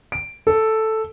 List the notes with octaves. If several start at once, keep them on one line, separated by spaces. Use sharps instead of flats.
D7
A4